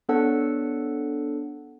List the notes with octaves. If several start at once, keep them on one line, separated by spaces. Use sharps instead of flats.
B3 D4 A4 C#5 F#5 A5